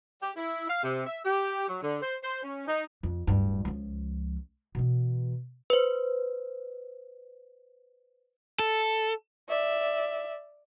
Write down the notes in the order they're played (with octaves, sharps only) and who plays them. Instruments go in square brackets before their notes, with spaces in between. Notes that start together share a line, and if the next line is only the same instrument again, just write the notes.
[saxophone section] G4
E4
F5
C3
E5
G4
F#3
D3
C5
C5
C#4
D#4
[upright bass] F2
D1 G2
C#2 F3
B2 E3
[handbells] B4 C5
[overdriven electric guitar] A4
[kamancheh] D5 E5